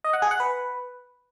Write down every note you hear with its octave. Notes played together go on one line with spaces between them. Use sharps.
D#5
F#5
G#4
F#5
B4